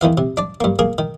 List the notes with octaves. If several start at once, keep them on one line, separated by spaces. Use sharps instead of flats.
E2 D#3 E3 F5
C3
D4 D5
G2 A#3
A#3 G#4 A#4
D#3